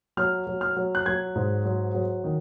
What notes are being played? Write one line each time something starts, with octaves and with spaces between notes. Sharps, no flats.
F#3 F6
F#3
F6
F#3
F#6
F#3 G#6
G#2
F#3
F#3
D#3